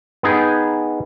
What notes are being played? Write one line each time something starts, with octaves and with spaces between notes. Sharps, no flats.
B3 D#4 G#4 G5